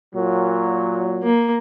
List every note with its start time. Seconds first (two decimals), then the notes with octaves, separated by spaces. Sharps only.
0.15 A#2 F#3
1.23 A#3